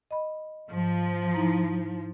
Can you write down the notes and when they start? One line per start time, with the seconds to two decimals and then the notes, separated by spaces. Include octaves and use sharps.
0.11 D#5 B5
0.71 G#2 F3
1.34 D#4 E4 A#5